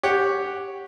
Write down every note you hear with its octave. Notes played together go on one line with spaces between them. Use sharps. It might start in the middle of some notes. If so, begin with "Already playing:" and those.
G4 C#5 F#5